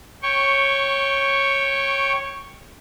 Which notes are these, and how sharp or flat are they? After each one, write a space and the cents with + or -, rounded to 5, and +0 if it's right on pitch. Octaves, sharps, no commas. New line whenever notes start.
C#5 -15 G5 +0 C#6 +0